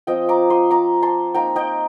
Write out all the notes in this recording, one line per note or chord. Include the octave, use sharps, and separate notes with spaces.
F3 C4 F4 D#5 G5
A#5 D6
C6 D#6
A#5 D6
A5 C6
A#3 D#4 G5 A#5
D#5 G5